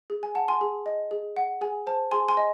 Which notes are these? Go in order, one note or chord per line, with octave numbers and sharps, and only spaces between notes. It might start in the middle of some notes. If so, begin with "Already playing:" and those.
G#4
G#5
F#5 A5
G#5 C6
G#4
D#5
G#4
F#5
G#4 G#5
C5 A5
G#4 G#5 C6
G#5 C6
D#5